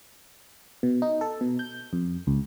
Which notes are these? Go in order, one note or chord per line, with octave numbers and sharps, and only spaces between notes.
B2
D#4
A4
B2
G6
F2
C#2